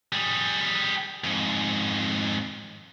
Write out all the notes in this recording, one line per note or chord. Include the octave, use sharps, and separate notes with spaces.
G3 G#4
F2 G#2